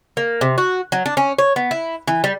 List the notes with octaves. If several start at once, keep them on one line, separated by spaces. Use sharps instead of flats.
A#3
C3
F#4
F#3
D4
C#4
C#5
B3
E4
E3
G3